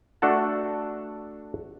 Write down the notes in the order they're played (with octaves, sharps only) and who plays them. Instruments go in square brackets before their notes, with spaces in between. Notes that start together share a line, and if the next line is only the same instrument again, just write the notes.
[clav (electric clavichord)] A3 D4 F#4 A4 F#5 A5